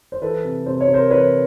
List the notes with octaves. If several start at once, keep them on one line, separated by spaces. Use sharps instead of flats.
C5
E3 A4 B4
C3
C3 C5
C#5
C3
A#4 C5
E3 B4 C#5